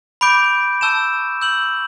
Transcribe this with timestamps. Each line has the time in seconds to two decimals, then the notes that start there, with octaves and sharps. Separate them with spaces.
0.21 B5 D6 G6 D7
0.81 A5 C#6 E6 G6 E7
1.41 C#6 E6 G6 F#7